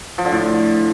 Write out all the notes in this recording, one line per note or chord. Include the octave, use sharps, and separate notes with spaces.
F3
D3
A2